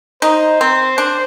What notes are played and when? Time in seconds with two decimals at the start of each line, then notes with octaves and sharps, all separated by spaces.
0.22 D#4 C5
0.61 C4
0.98 D4